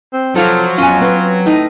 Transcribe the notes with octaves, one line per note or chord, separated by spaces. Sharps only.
C4
C3 F3 F#3 F4 A4
F2 B3 C#4 F4 G#5
C4 B4
A2 D#4 D#5